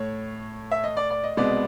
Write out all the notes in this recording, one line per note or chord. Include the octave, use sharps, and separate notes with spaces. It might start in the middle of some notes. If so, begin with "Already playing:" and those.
Already playing: A2 A3 C#5
E5
D#5
D5
D5
D#5
C2 B2 G#3 B3 D5